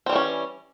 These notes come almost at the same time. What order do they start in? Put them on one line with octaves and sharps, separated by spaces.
C4 G3 E3 C#4